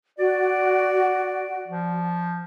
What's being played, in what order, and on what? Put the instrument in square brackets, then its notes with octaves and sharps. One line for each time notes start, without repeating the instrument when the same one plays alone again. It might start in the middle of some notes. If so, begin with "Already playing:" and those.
[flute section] F#4 [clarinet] D5
[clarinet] F3